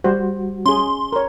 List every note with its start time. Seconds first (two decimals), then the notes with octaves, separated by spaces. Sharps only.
0.04 G3 F#4 C5
0.66 C#4 G#4 C6
1.13 A#4 C#5